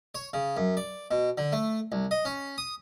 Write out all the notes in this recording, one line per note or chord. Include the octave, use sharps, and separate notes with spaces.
C#5
C#3
F#2
D5
B2
D3
A3
C2
D#5
C#4
D#6